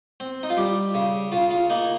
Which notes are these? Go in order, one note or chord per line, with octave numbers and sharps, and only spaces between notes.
C4
D#4
F4
G3 G4
C#3
C#3 F4
F4
A#3 D#4